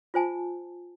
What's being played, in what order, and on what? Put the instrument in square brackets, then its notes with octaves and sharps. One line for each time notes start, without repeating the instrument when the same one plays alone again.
[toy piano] F4 C5 G#5 A5